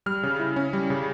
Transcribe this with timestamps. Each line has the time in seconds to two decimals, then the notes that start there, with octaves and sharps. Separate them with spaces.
0.06 G3 F6
0.23 C#3
0.39 E4
0.56 C#4
0.73 G3
0.90 C#3